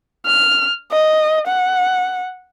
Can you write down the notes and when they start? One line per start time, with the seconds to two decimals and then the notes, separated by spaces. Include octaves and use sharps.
0.26 F6
0.92 D#5
1.47 F#5